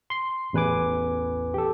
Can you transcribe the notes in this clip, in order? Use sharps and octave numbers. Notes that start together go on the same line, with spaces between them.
C6 C7
A1 E2 B4 G#5 D6
G4 A4